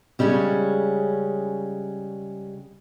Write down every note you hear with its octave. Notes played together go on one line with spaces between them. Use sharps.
C#3 G3 G#3 C#4